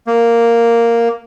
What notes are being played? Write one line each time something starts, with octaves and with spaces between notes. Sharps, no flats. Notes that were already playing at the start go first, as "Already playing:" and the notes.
A#3